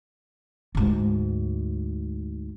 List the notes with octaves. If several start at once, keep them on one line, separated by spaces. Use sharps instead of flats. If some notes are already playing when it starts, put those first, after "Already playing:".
D2 G#2